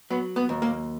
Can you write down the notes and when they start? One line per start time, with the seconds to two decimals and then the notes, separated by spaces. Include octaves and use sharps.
0.10 F#3 B3
0.36 B3
0.49 D#2
0.62 A#3